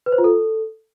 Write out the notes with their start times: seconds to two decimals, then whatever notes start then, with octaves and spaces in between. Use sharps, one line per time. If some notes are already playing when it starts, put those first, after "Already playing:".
0.06 B4
0.12 C5
0.18 F4
0.24 A4